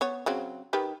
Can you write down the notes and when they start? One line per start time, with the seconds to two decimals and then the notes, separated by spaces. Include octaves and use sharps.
0.01 B3 C#5
0.26 C#3 F#3 C4
0.73 D#3 G4 B4